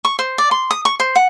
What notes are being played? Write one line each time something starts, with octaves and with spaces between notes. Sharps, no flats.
C#6
C5
D5
C6
D#6
C#6
C5
F#5